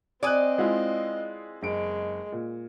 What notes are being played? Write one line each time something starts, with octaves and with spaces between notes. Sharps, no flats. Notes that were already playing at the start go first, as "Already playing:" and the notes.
C4 D5 D#5 G#5 D#6 F#6
G#3 E4 F4
F#1 G#3 D7
A#2